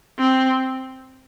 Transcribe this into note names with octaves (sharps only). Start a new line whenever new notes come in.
C4